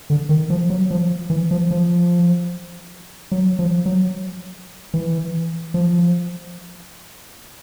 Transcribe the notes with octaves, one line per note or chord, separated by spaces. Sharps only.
D3
D#3
F3
F#3
F3
E3
F3
F3
F#3
F3
F#3
E3
F3